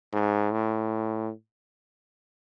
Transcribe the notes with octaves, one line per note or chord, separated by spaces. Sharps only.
G#2
A2